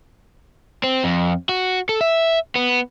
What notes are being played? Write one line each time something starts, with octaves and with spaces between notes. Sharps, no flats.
C4
F2
F#4
A4
E5
B3